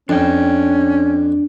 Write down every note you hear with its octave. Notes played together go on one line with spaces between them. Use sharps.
F2 C#4 D4 D5 G5